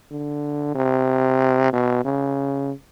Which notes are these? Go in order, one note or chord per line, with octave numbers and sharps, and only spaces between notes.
D3
C3
B2
C#3